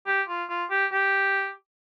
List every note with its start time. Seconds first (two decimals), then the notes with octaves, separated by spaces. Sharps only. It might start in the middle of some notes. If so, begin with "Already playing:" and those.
0.07 G4
0.28 F4
0.49 F4
0.71 G4
0.92 G4